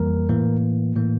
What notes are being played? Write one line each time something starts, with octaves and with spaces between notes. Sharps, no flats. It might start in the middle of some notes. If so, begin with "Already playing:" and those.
Already playing: F2 E3 G3 A#3 A#4
A2 E3 A#3
A2 E3 A#3